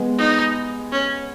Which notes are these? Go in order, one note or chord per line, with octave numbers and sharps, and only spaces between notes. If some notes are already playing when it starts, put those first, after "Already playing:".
Already playing: G#3 B3
D#4
C#4